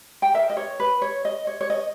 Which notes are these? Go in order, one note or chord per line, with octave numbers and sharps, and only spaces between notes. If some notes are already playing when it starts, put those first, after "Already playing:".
G5
D#4 A#4 E5
D#5
C#5
B4
C#5
D#5
C#5
C#5
D#5